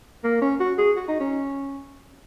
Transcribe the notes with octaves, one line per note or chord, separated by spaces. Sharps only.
A#3
C#4
F#4
G#4
F#4
D#4
C#4